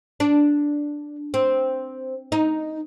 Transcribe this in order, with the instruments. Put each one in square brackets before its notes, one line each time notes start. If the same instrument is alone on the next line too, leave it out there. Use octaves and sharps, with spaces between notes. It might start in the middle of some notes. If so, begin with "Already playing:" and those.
[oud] D4
C4
D#4